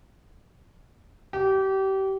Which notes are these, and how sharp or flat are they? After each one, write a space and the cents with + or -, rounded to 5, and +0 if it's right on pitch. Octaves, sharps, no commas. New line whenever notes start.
G4 -30